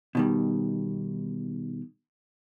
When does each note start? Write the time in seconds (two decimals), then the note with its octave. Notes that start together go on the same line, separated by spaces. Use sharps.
0.15 B2 D#3 G3